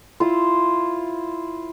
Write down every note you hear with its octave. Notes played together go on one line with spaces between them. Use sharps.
E4 F4 C5